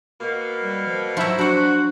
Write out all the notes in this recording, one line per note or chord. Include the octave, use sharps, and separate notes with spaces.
B2 A#3
G3
F3
F3 F#3 E4 C5
D4 F#4 F#5